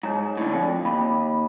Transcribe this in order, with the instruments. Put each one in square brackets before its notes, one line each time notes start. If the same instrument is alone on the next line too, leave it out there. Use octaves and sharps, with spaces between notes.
[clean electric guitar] G#2 [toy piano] D#4 C#5 A#5
[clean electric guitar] A2 D3
[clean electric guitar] F2 [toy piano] D#4
[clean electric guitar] D#2 [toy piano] B5